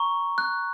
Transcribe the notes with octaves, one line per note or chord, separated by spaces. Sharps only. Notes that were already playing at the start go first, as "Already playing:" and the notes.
Already playing: A#5 C#6
F#6